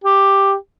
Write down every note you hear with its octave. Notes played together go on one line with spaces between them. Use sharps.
G4